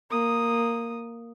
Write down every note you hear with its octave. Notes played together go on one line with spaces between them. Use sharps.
A#3 D#6